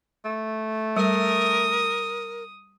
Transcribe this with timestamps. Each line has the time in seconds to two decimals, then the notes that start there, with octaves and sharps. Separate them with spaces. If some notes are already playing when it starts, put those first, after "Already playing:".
0.25 A3
0.97 G3 A#4 D#6